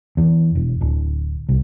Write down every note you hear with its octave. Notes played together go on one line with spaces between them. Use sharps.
E2
E1
D1
C2